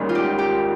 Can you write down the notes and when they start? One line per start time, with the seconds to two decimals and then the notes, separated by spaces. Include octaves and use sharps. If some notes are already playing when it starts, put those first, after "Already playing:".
Already playing: G#1 G#2 G3 A#3 C#4
0.09 F4
0.15 G4
0.39 G4